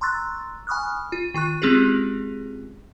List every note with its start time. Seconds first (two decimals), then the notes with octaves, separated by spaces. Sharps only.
0.01 A#5 C6 C#6 E6 F#6 A6
0.67 G#5 B5 C#6 D#6 F6 F#6
1.12 F4
1.34 D#3 F4 C#6 F#6
1.62 G#3 C4 C#4 F4 G4 G#4